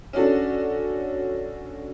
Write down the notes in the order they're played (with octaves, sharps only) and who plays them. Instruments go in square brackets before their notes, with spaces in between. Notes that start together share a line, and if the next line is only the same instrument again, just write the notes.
[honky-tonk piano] C#4 D4 F#4 A4